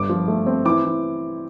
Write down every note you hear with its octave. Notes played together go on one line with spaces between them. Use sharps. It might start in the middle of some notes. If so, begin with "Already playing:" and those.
Already playing: G1 G2 D6
F3
A3
C4
E3 D6
E3